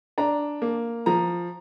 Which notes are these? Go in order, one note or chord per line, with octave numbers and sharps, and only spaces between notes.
D4 A#5
A#3
F3 A#5